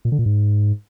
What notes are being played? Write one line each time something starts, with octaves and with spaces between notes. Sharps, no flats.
A#2
D3
A#2
G#2